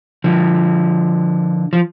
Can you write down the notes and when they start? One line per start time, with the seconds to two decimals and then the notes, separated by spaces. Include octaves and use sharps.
0.24 D3 F3
1.73 F3